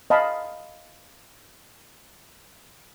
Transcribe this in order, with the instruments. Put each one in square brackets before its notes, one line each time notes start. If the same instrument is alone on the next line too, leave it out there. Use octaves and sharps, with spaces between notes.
[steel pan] D#5 F5 A5 B5